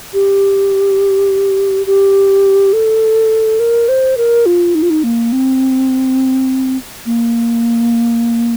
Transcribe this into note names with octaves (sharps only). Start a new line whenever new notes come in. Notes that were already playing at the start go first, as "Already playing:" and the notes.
G4
G4
A4
A#4
C5
A#4
F4
D#4
F4
D#4
A#3
C4
A#3